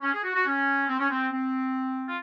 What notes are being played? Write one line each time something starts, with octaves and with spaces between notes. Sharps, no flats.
C#4
G#4
F#4
F#4
C#4
C4
C#4
C4
C4
F4